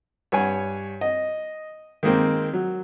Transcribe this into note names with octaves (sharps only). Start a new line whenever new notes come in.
G2 C#5 F#5 G#5
D#5
D#3 G#3 A#3 C4
F#3